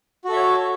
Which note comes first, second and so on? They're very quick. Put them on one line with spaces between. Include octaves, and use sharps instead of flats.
F#4 A4 E5 C#5